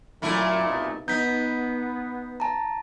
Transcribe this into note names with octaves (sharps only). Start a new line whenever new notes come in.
F#2 A#2 A3 E4
C2 B2 D#4
B3 D#4 G6 B6
A5 A#5